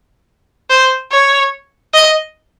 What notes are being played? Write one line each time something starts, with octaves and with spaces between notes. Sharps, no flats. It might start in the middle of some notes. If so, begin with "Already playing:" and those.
C5
C#5
D#5